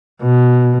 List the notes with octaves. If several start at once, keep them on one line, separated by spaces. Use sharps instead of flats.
B2